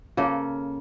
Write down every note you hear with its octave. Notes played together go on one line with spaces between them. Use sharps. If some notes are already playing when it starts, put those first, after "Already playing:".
C#3 A#3 A4 A#4